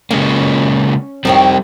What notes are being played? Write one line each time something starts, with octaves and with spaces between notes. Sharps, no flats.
C#3 G#3 A#3 C#4
F2 D#3 G3 C4 C#5